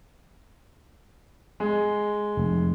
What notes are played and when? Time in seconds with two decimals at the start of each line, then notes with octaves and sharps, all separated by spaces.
1.60 G#3
2.37 F1